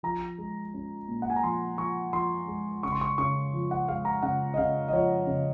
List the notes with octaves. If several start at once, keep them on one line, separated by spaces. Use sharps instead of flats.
F3 A#5
G#3
C#4
A#2
F#5
G#5
A#5
F3 C6
F3 C#6
F3 C6
G#3
C#3 C#6
C6
C#6
C#3 C#6
F3
F#5
G#3 F5
A#5
C#3 F#5
D#5
C#3 F5
D#5
F3 C#5
C#3